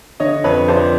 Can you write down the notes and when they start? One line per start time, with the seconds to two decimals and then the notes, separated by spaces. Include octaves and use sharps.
0.20 D3 C#5 D#5
0.44 F2 B4 C#5
0.68 F2 C5 D5